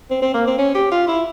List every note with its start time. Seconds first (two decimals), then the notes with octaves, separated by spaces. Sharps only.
0.11 C4
0.22 C4
0.34 A#3
0.47 C4
0.58 C#4
0.75 G4
0.92 F4
1.08 E4